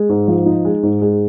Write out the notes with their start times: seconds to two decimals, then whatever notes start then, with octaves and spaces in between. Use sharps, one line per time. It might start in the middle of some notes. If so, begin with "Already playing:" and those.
Already playing: G#3
0.09 G#2
0.28 F3
0.46 D#4
0.65 G#3
0.83 G#2
1.02 G#3